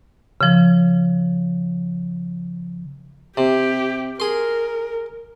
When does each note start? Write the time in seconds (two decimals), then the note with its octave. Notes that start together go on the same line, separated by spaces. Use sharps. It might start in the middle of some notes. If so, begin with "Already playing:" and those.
0.41 C#3 F3
3.37 C3 G4
4.20 G#4 A#4 C6